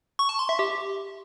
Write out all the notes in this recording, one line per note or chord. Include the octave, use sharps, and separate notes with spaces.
C#6
A5
C6
E5
G4